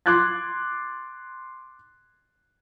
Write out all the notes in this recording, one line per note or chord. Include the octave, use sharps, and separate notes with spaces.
C6 D6 F#6 G#6 A6